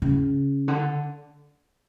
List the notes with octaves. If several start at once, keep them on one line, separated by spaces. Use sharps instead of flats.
C#3
D3